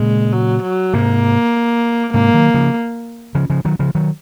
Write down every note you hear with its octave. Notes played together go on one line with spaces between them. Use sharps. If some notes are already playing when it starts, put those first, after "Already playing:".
Already playing: A#2 C#3 G#3
F#3
F#3
G#2 C3 A#3
G#2 C3 A#3
D#3 F#3
C#3 F3
C#3 F3
C#3 F3
D#3 F#3
C#3 F3
D#3 F#3